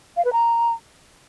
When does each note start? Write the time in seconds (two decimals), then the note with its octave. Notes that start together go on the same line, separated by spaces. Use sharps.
0.16 F5
0.24 B4
0.32 A#5